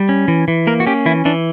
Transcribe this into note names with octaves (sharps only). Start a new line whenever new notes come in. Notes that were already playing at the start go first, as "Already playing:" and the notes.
Already playing: G3
C#4
E3
E3
A#3 A#4
F#4
C#4 G4
E3 E4
E3 D4